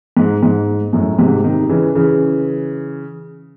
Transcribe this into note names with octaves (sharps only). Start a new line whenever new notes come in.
G#2
G#2
F#2 A2
G#2 C3
C3 D#3
C#3 E3
C#3 E3